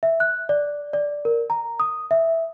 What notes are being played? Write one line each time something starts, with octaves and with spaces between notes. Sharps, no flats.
E5
F#6
D5
D5
A#4
A#5
D#6
E5